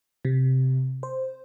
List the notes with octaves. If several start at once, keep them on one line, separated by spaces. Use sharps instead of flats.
C3
C5